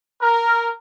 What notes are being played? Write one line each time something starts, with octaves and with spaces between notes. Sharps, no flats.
A#4